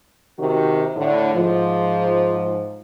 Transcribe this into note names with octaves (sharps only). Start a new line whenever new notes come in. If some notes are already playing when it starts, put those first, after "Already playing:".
C3 D#3 F#4
A2 D3
G#2 F3